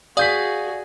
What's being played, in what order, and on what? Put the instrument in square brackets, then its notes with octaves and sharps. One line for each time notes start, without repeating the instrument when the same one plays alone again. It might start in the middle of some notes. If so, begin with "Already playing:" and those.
[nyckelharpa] F#4 G#4 [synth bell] D5 F5 [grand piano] D#6 G6 B6